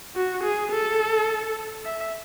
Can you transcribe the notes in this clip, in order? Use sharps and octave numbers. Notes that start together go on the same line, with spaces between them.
F#4
G#4
A4
E5